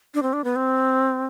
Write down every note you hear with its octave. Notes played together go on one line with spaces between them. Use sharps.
D4
C4
D4
B3
C4